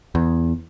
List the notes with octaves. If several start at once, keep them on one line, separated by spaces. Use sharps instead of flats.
E2